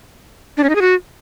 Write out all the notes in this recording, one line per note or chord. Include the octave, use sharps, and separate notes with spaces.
D4
C#4
D#4
G#4
F#4